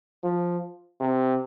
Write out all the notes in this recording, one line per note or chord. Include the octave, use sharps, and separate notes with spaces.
F3
C3